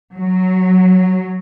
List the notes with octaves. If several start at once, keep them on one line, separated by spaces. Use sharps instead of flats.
F#3